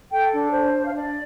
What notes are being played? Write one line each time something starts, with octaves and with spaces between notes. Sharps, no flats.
A4 G5
D4
C5
D4
F5
D4 D5